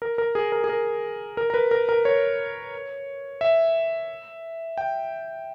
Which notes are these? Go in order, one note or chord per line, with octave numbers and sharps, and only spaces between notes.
A#4
A#4
G#4
A#4
G#4
A#4
A#4
A#4
B4
A#4
A#4
C#5
E5
G5